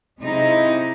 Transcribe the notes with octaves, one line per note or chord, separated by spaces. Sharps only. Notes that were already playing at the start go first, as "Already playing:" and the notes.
C3 G#3 D#4 E4